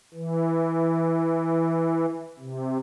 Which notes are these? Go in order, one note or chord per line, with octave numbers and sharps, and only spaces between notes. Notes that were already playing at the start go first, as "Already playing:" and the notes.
E3
C3